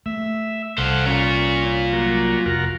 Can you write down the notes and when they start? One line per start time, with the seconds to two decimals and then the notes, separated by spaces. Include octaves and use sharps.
0.06 A3 E5
0.78 C2 A4 C5 F5 F#5
1.06 C#4 F4 A#4
1.93 F#3 A#3
2.46 F1 F4 F#4 A#4